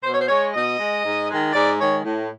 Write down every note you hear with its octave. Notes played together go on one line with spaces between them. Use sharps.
B2 C5
C#5
C5
G#3 C#5
B2 D#5
G#3
G#2
D#3 G#3
G#2 D5
D#3 G#3 C#5
A2